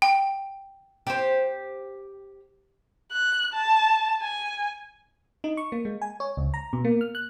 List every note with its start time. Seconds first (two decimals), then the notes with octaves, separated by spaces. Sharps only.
0.02 G5
1.07 G4 C5
3.12 F#6
3.54 A5
4.22 G#5
5.44 D#4
5.57 C#6
5.72 A#3
5.85 G#3
6.02 G#5
6.20 C#5
6.37 C#2
6.54 A#5
6.73 B2
6.85 A#3
7.01 F6
7.15 F#6